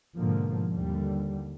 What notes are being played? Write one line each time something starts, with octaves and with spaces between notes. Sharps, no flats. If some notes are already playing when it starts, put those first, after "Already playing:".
G#2 B2 D3 F3 A#3
D#2 D3 G3